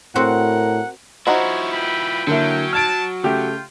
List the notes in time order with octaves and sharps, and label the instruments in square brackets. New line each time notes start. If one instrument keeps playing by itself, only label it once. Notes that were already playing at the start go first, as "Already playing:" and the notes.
[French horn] A2 [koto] C4 F#4 [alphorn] A#4 [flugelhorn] F#5
[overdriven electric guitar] F3 E4 [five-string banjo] D#4 F#4 C5 [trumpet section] C#5
[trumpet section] B4 G5 B5
[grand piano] D3 A#3 E4 [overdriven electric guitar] F#3 [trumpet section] C#4 G5
[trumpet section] A5 [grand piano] F6 G#6 D7
[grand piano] C#3 A3 G4 [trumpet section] F4 G5